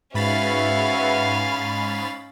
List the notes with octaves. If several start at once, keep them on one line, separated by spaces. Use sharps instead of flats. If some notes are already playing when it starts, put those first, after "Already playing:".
G#2 C#4 F#4 B4 E5 F5 B5 A6